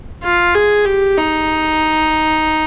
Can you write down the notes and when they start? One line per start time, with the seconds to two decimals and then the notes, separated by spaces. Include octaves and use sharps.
0.23 F4
0.55 G#4
0.85 G4
1.18 D#4